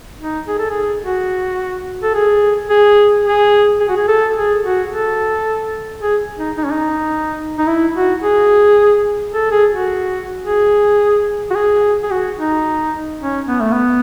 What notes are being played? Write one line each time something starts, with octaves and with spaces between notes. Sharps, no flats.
D#4
G#4
A4
G#4
F#4
A4
G#4
G#4
G#4
G#4
F#4
G#4
A4
G#4
F#4
A4
G#4
D#4
D#4
C#4
D#4
D#4
E4
F#4
G#4
A4
G#4
F#4
G#4
F#4
G#4
G#4
F#4
D#4
C#4
B3
A3
B3